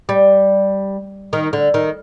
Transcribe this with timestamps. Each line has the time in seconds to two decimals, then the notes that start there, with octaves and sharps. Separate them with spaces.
0.09 G3
1.33 D#3
1.53 D3
1.74 D#3